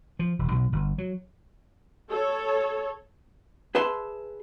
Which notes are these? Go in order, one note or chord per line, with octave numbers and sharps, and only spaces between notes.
F3
E1
B1
G1
F#3
A4 C#5
G#4 B4 E5 A5 C6